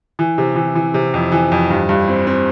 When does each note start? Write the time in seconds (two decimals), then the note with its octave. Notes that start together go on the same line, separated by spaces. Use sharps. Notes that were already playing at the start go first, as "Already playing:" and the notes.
0.19 E3
0.38 C3
0.56 E3
0.75 E3
0.94 C3
1.14 F2
1.32 E3
1.52 F2
1.70 G2
1.89 G2
2.08 C4
2.27 C4